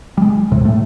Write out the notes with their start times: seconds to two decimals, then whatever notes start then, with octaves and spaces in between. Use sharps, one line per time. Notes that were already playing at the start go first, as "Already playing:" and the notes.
0.17 G3 G#3
0.51 D#2 A2 C3
0.65 A2 A3